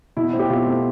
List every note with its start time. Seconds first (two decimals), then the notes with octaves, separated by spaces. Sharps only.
0.17 B2 E4
0.33 A3 C4
0.39 G4
0.50 B2 F4
0.67 A3 C4